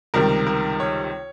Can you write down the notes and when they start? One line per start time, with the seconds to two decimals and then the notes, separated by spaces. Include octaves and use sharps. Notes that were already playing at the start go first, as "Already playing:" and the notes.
0.14 C#2 C3 D#3 G3 A#4
0.47 A#4
0.80 C#5